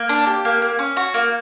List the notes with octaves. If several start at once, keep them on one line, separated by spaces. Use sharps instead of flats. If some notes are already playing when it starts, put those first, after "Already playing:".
Already playing: A#3
D4
G4
A#3
A#3
C#4
F#4
A#3